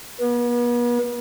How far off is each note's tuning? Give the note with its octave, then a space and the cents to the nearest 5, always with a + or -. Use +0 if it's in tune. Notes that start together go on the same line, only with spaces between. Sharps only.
B3 -40